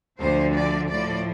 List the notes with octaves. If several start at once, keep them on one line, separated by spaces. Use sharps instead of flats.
D2 D3 F3 C5
D5
A2 F3 D5